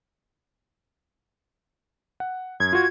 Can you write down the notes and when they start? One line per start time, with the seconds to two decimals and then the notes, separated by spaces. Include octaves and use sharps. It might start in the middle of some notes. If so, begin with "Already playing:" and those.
2.20 F#5
2.60 F#2 G#6
2.73 F4 F#4